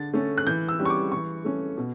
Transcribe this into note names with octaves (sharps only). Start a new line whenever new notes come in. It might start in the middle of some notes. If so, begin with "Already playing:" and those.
Already playing: D3 A6
A3 C#4
F#6
E3 G6
E6
G3 C#4
C#6
D6
E3 C#6
A3 C#4
B2